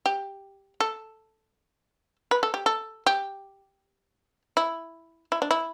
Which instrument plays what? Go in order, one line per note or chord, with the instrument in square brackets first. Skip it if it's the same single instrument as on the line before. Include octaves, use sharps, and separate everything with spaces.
[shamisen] G4
A4
B4
A4
G4
A4
G4
E4
E4
D4
E4